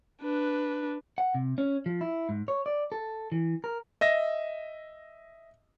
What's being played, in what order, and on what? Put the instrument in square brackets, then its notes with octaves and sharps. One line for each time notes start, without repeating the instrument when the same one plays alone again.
[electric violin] D4 B4
[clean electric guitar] F#5
C3
C#4
F3
E4
G#2
C#5
D5
A4
E3
A#4
[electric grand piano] D#5 E5 A#6